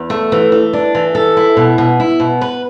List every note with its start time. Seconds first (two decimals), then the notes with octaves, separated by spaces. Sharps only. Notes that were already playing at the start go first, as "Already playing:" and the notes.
Already playing: E2
0.10 A3
0.32 E3
0.52 E3
0.73 D4
0.95 E3
1.15 A4
1.37 E4
1.57 B2
1.78 B2
2.00 E4
2.20 B2
2.41 B4